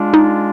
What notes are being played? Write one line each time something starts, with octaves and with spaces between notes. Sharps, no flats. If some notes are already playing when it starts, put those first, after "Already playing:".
Already playing: G#3 D4 F4
D#4